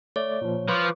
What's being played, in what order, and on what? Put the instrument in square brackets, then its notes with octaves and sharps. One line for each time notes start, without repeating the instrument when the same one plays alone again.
[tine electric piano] A3 D5 [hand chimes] C#5
[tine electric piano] A#2 F3
[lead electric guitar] F3 [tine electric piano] B4 C#6 D6